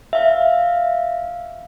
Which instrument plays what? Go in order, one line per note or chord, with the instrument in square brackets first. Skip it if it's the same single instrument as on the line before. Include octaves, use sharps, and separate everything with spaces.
[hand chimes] E5 F5